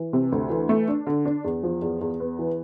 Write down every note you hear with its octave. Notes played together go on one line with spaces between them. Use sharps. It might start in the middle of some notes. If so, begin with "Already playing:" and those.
Already playing: E3
C3
D2
E3
A3
D4
D3
D4
E2
F3
E2
E2
B3
E3